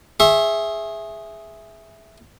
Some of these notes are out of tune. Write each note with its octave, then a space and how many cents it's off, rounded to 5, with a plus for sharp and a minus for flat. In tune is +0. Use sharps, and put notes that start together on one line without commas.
G#4 +0 E5 +0 C#6 -45